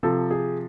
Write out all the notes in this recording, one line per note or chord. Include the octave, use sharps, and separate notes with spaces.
C3 F3 A4
G#4